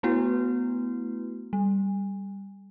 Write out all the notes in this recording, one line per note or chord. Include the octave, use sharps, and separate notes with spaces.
A3 B3 E4 F#4 B4
G3